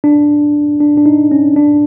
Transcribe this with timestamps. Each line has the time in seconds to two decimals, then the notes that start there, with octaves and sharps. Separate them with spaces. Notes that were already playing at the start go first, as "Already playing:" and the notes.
0.04 D4
0.81 D4
0.98 D4
1.06 D#4
1.32 C#4
1.56 D4